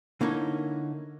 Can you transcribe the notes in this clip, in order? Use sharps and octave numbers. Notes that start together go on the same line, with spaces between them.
D3 A#3 C#4 D#4 E4 C#5